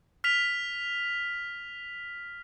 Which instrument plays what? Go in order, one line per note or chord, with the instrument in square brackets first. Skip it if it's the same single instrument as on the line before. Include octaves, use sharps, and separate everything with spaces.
[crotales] F6 B6 F7